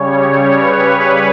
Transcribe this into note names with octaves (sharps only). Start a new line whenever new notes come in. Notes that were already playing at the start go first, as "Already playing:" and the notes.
Already playing: C#3 G3 C#5
C#5
B4